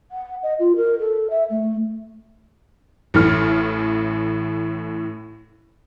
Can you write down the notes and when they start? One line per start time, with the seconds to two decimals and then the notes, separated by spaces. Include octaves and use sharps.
0.12 F#5
0.43 D#5
0.60 F4
0.76 A#4
0.99 A4
1.30 E5
1.50 A3
3.14 A1 A2 F6